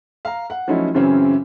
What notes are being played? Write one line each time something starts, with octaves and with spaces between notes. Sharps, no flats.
F5 A#5
F#5
F3 F#3 A3 C#4 D#4 E4
F#2 C#3 E3 F#3 C4 C#4